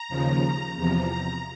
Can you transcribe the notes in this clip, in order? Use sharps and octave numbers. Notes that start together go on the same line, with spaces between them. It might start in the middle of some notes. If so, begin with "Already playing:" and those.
Already playing: A#5
D#2 C#3 F3
E2 C3 F3 A#5